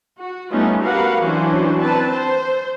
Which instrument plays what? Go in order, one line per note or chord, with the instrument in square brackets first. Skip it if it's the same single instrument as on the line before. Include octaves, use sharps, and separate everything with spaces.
[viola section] F#4
G3 A3 B3 C#4 D#4 F4
F#4 G4 A#4 B4 F5 F#5
E3 F#3 C#4 D4 F#4 C5
C4 B4 A5
C5